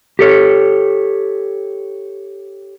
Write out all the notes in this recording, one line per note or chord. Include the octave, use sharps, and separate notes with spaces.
G4 A4 C#5